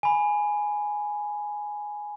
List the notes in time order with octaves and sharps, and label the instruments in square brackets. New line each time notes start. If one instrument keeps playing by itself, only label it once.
[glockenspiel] G#5 B5